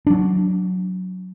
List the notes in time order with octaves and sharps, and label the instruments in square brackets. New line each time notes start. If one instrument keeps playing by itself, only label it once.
[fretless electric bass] F#3 D4